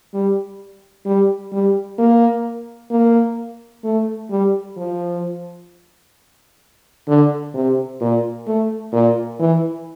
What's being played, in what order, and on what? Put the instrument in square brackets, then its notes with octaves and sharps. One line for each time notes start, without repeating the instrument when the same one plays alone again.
[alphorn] G3
G3
G3
A#3
A#3
A3
G3
F3
D3
C3
A#2
A3
A#2
E3